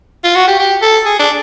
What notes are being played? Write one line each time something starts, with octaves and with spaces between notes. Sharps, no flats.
F4
F#4
G4
G4
A4
G#4
D4